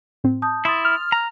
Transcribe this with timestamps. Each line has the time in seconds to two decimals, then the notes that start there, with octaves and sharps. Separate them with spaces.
0.24 A2 C4
0.42 A5 D#6 G6
0.65 E4 C6 D#6 A6
0.85 F6
1.12 A#5